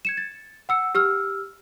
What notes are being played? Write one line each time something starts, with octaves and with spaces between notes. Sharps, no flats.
G#6 C#7 E7
A6
F#5 E6 C#7
G4 E6 F6